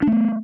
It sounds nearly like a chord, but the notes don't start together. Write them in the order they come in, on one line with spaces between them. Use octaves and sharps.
D4 A3 B3